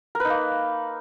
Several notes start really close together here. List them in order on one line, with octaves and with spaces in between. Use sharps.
A#4 B4 D#4 A#3